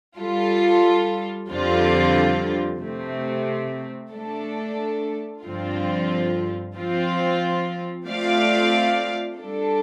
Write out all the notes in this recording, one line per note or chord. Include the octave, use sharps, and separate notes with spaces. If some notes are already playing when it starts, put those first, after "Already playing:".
G3 F4 A4
F2 D3 G3 C4 F4
C3 A3 C4
A3 D4 A4
G2 D3 F3 C4 F4
F3 C4 F4
A3 C4 F4 D5 F5
G3 D4 A4